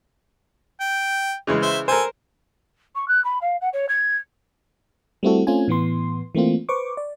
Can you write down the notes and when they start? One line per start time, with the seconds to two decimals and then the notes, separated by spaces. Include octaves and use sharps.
0.80 G5
1.47 C#3 E3 G#3
1.62 C5 E5
1.88 A4 A#4 C5 G#5
2.95 C#6
3.08 F#6
3.24 B5
3.42 F5
3.61 F#5
3.73 C#5
3.89 G#6
5.23 G3 A3 C4 E4 F#4 A4
5.47 A3 C4 C#4 F4 G#5
5.68 A2 E3 B3 C6
6.35 E3 A3 A#3 C4 F4
6.69 B4 C5 C#6 D6
6.97 D5